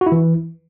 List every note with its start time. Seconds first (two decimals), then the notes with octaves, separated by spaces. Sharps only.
0.01 F#4
0.06 E4
0.12 E3